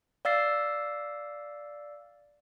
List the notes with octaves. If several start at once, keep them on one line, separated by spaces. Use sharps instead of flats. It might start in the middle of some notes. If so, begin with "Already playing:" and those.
D5 F5 E6 A6 C7